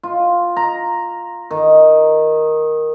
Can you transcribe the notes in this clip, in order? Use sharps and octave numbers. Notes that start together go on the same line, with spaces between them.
F4
A#5
D#3